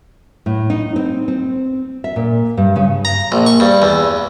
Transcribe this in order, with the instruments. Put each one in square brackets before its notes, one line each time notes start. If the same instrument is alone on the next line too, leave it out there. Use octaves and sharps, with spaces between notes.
[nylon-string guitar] A2
D#4
C4
C4
E5
A#2
G2
C#3
[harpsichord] A#5
A#1
C#6
G2
E2